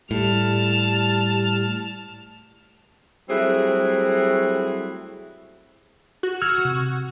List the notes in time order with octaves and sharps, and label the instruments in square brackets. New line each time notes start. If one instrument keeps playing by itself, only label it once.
[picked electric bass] A2 [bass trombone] G3 [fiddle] A5 F6
[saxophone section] F#3 G3 A3 C4 E4 G#4
[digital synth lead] F#4
[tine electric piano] E6 F6 G#6
C3